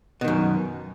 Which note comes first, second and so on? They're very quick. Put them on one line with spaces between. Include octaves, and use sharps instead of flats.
B2 D#3 F#2